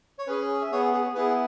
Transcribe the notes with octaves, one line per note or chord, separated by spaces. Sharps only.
C#5
C#4 G#4 B4
E5
B3 G#4 C#5
G#4
B3 E4 G#4 B4